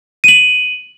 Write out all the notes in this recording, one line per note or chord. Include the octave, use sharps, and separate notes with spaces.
D#7 F#7